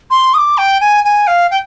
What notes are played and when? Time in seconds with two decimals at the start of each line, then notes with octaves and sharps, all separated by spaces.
0.11 C6
0.34 D#6
0.38 D6
0.58 G5
0.81 G#5
1.05 G#5
1.27 F5
1.51 G5